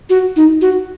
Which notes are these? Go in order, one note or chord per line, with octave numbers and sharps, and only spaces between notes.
F#4
D#4
F#4